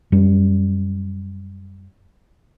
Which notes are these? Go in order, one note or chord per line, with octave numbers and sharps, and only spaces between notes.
F#2 G3